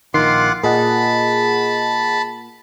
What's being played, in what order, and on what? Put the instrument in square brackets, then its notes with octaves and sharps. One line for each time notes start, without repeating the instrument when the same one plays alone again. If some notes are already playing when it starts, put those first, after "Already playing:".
[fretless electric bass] A#1 D#3 [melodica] F4 F#5 D6 [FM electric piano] C6 C7
[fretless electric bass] A#2 [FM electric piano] G#4 D#5 F#5 [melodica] A5 B5